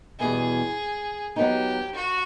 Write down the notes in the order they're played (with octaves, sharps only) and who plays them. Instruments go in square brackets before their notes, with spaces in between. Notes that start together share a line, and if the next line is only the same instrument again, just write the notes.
[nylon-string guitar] E2 B2 G3 B3 E4 [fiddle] G#4
[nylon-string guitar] F#3 B3 D#4 [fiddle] G4
[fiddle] F#4